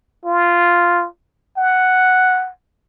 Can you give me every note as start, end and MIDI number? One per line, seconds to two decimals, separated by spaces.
0.26 1.06 65
1.57 2.50 78